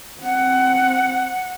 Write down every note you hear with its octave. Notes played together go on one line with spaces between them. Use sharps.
C4 F#5